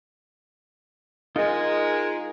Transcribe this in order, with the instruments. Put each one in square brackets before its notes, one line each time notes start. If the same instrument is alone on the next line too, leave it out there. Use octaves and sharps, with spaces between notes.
[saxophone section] G#3 A#4 [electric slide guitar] D#4 F4